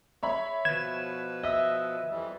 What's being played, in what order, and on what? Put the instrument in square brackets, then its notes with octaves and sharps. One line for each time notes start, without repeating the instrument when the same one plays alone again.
[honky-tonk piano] C#5 E5 B5
[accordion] B2 F3 B4 [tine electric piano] G#6 [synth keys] E7
[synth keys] D#5 E5 [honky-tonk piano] E6
[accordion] F2 E3 G3